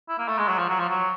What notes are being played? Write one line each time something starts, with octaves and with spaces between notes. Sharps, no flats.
E4
A#3
A3
G#3
F#3
F3
F#3
F3
F#3